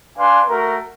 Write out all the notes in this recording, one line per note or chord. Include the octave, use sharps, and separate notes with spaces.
D4 B4 F5 G#5 C6
A3 F#4 A#4